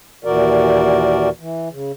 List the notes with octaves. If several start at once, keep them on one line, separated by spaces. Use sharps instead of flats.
D#2 A#2 E3 F#4 A#4 D5
E3
C#3